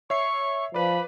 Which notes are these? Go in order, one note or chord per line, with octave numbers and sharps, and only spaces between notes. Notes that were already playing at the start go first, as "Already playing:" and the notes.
C#5 E5 C#6 C7
F3 B4 D5 B5